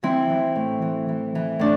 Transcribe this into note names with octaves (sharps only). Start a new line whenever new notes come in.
E3 C4 E4
E3
A2
E3
E3
E3
A2 D4